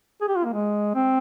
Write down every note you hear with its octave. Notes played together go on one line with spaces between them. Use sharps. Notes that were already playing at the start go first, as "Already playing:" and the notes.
G#4
G4
F4
A#3
G#3
C4